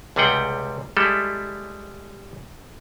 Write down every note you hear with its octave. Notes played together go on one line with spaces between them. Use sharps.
C#2 C3 G3 G#4 F#5 G5
G3 G#3 E4 A4